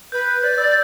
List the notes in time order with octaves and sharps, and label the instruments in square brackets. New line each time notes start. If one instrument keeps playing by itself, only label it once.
[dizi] B4 [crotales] G6
[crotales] G6
[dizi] D5 [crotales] G6
[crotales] E6